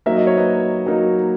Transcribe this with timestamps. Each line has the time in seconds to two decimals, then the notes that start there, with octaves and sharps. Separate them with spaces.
0.06 F#3 A#3 D#4 E5
0.17 D#5
0.27 C#5
0.37 B4 D#5
0.86 F#3 A#3 D#4